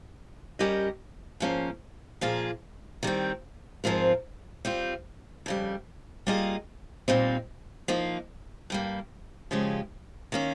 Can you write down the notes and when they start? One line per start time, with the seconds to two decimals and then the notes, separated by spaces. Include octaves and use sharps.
0.59 G3 C#4 G4 A#4 D#5
1.40 G#2 F3 A#3 C#4
2.21 A#2 F3 A#3 F4 G#4
3.03 D#3 G3 C4
3.84 G#2 F3 C4 F4 A#4
4.65 G3 C4 F4
5.46 F2 C#3 G3
6.27 G3 A#3 F4 G#4 D#5
7.08 A#2 G3 C4 D#4
7.88 F3 A#3 D#4
8.70 G2 G3 A#3
9.51 C#3 F3 G#3 C#4 G4
10.32 D#3 A#3 C#4